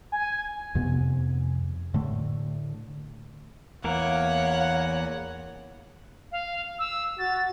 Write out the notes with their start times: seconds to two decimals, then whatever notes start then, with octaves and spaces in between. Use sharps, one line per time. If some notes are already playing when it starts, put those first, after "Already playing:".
0.12 G#5
0.75 F2 C3 B3
1.94 A2 D3 A3
3.84 E2 E3 A#3 A#4 C#5 F5 F#5
6.32 F5
6.79 E6
7.19 F#4 A6